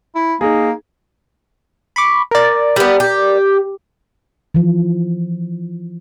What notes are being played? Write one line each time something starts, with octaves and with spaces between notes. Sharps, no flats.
E4
A#3 D#4 G#4
B5 C#6 D6
A#4 D5
G3 B3
G4
E3 F3